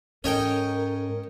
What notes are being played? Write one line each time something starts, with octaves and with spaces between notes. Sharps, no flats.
G#2 C#4 A4 A#4 C#5 D#5 G5